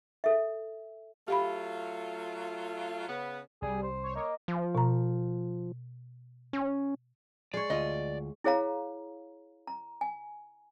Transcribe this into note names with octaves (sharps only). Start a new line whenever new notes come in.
A4 E5
F#3 A3 F4 G4 F5 B5
C#3 B3
C2 G3 G#4
C5
C#5 C#6
A#3 D#5
F3
B2 A#5
C#4
G#3 C#5 D5
D2 F4 D#5 G#5
E4 G#4 C#5 F5 A#5
A#5
G#5